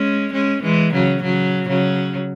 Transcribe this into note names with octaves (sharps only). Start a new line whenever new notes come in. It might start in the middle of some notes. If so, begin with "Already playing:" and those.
Already playing: G#3 C#4
G#3 C#4
E3 G#3
C#3 F#3
C#3 F#3
C#3 F#3